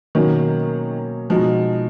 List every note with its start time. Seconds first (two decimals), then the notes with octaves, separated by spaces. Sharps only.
0.15 B2 D#3 F#3 A#3 C#4
1.29 B2 F3 G#3 D#4 F#4